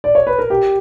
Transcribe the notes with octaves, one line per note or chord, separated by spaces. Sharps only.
D5
C#5
B4
A#4
G4